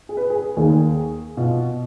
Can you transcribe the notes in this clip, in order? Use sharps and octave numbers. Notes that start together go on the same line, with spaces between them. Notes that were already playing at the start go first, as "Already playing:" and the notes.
G#4
B4
G#4
D#2 D#3 G#4
B2 F4